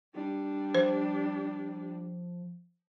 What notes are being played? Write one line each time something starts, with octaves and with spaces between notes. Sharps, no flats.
G3 D4
F3 C5